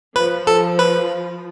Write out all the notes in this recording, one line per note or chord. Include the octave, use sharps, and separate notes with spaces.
F3 B4
A4
B4